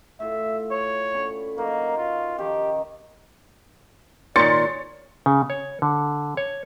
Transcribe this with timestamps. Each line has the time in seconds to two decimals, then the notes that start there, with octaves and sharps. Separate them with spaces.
0.20 A2 F4 E5
0.72 C#5
1.14 D3 C#4 B5
1.58 F#3 A#3 D#4 A#4
1.97 F4
2.38 D#3 F3 C#4 G4
4.36 A#2 D#3 C#5 D5 C6 A6 C#7
5.26 C#3
5.50 C#5
5.82 D3
6.37 C#5